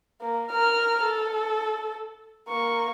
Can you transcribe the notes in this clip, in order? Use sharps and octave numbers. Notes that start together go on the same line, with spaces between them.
A#3
A#4 F6
A4
A#3 C#6